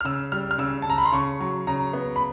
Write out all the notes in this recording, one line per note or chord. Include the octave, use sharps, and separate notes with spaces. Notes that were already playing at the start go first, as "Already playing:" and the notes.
F6
C#3 E6
G3 F6
F6
C#3 E6
A5
C#3 A#5
B5
C6
C#3 C#6
F#3
C#3 A#5
B3
B5